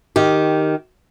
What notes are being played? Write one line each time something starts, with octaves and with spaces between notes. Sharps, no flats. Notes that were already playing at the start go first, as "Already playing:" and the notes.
D#3 G4